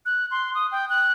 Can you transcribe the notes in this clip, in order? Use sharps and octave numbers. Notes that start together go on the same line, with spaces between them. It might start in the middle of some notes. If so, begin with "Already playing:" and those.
F#6
C6
D#6
G5
F#6